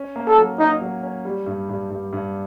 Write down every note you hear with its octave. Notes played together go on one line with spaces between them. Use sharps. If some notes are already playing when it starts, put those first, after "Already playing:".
Already playing: C#4
A#3
A4
F#3
A#3 D#4
F#3
C#4
G3
G2
G2
G2
G2